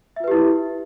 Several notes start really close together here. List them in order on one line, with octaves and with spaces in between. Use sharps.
E5 F4 B4 G4 E4